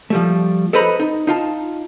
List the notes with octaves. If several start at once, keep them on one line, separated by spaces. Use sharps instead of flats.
F3 G3 A3
A4 B4 C5 D#5 A#5 B5
D#4
D#4 F4 A5